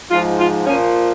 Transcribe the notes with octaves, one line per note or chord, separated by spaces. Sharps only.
G#2 F3 F4
F4
A#2 F3 C#4